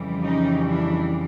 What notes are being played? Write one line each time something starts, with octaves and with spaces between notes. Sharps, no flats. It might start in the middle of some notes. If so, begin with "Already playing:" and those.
Already playing: F2 C#3 E3 G3
C#4 D#4
D4 E4